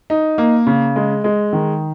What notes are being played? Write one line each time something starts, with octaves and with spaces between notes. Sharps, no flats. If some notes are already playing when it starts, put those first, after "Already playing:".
D#4
A#3
C#3
G#3
G#3
D#3